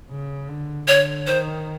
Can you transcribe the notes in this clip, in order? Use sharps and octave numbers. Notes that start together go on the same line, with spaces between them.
C#3
D3
D3 C#5
D#3 C5